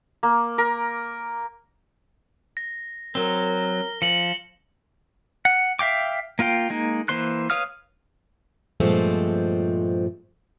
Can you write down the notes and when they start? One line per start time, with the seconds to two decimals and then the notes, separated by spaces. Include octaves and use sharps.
0.23 A#3
0.58 A#4
2.57 A#6
3.15 F#3 C4 A#4 G7
4.02 F3 C#7 F#7
5.45 F#5
5.79 E5 F5 G5 D6
6.39 A#3 F4 F5 G5
6.70 G#3 A#3 D#4
7.08 E3 A#3 C5 C6 F#6
7.50 B4 C#5 F5 D#6 F6
8.80 G2 A#2 F3 G#3 A3 C4